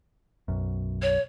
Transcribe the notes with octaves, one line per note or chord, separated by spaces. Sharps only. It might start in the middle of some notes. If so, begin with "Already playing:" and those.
B1 F#2
C#5